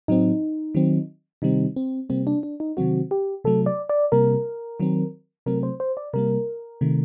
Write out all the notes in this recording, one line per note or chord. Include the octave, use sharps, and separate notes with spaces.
A2 F#3 C4 D#4
D#3 F#3 C4
C3 D#3 G3 C4 D#4
C4
C3 G3 A#3 C4
D4
D4
D#4
C3 D#3 F#3 C4 F#4
G4
C3 F#3 A3 A4
D5
D5
C3 G3 A#3 A#4
D#3 F#3 C4
C3 F#3 A3 C4 A#4
C5
C5
D5
C3 G3 A#3 A#4
C3 D#3 A3